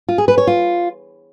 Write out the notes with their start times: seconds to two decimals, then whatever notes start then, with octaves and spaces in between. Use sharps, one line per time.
0.09 F4
0.18 G#4
0.28 B4
0.38 C#5
0.47 F4